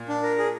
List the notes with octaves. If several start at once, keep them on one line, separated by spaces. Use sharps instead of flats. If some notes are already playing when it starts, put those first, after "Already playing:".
Already playing: A#2
D4
A#4
G#4